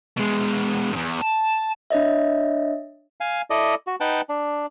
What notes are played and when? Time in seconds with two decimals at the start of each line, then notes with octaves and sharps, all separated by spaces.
0.17 B2 G#3
0.92 E2 G2
1.21 A5
1.90 D4 C#5 D#5 E5
3.21 F5 G#5
3.50 E4 A4 D5 D#5
3.87 F#4
4.00 D#4 B4 F#5 G5 A5
4.29 D4